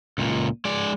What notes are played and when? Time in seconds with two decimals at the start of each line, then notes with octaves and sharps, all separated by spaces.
0.18 C#2 A#2
0.65 G#3 D5